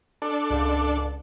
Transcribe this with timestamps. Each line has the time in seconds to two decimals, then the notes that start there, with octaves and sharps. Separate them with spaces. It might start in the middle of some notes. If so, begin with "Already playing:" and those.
0.22 D4 A4
0.50 C#2 G#2